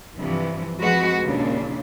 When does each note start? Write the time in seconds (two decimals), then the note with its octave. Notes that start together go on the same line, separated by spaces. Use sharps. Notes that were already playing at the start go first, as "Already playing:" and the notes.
0.18 G2 C3 E3 F3
0.79 F2 F3 G#3 F#4 B4
1.23 D#2 A#2 C#3 D4